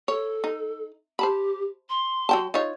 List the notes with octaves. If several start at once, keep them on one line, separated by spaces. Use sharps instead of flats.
A4 C#5
D#4
G4 C5 A5 B5
C6
F#3 G5 A5
D#4 F4 C#5